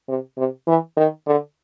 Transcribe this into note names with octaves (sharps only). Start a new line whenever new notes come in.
C3
C3
E3
D#3
D3